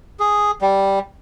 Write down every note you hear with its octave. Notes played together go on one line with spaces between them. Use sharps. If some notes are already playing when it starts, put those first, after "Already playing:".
G#4
G3